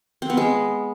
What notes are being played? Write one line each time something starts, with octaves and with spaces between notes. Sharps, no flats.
C4
B3
G#3